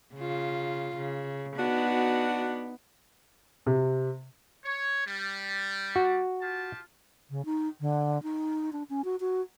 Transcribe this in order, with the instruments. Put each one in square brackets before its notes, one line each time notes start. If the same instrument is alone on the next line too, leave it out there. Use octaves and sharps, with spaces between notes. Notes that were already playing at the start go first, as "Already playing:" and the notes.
[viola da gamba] C#3 F4
C#3
[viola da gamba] B3 D#4 [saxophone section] D4 F#4
[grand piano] C3
[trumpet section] C#5
G3
[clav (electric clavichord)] F#4
[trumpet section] F4 G4 A5
[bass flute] C#3
D#4
D3
D#4
D4
C#4
F#4
F#4